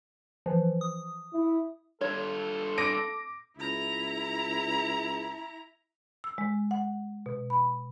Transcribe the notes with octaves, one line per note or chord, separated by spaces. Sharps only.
E3 F3
D#6
E4
G2 F4 A4 C#5
D6 A#6 D7
C#2 E4 A#5
E6
G#3
F#5
B2
B5